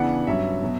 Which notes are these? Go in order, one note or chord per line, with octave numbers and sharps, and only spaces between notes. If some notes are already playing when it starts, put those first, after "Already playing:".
Already playing: C#3 E3 B3 D4 F#5
G2 F#3 C#4 E5
B2 F#3